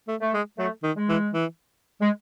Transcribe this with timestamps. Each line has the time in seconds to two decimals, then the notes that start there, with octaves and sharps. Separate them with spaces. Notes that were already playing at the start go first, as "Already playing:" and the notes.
0.08 A3
0.21 A3
0.34 G#3
0.58 F#3 A3
0.83 D#3
0.96 G#3
1.09 E3
1.34 E3
2.00 G#3